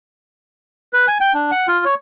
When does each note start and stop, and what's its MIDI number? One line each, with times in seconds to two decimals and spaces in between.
0.93 1.06 71
1.08 1.18 80
1.21 1.33 79
1.34 1.51 62
1.51 1.67 78
1.68 1.85 65
1.85 1.95 73